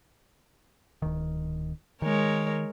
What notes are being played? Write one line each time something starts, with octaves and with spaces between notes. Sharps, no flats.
D1 D#3
D#3 G#3 A#4 C#5